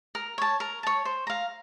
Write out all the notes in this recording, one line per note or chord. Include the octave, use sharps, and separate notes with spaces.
A#4
C#5 A5
A#4
C#5 A5
C5
F5 A#5